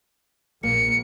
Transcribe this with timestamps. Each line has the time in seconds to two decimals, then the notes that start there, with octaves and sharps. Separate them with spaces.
0.63 A#1 A#3 C#7